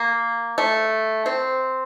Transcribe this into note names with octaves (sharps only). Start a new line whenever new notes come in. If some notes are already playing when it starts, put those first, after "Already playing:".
Already playing: A#3
A3
C4